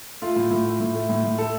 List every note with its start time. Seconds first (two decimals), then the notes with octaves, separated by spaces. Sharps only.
0.22 A3 F4
0.36 A2
0.51 A2
0.66 A3
0.80 A2
0.95 A3
1.09 A2
1.24 A2
1.38 A3 A4